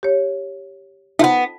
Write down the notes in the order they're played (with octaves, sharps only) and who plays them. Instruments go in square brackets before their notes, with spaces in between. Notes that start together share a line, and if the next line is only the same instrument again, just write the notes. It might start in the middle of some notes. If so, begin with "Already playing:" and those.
[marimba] G4 C#5
[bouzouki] A3 B3 [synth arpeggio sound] D#4 F4 C5